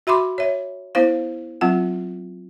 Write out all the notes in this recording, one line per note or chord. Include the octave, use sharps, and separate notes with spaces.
F#4 E5 B5 C6 D6
C#5 E5
B3 E4 C5 F5
F#3 C4 F4 F#5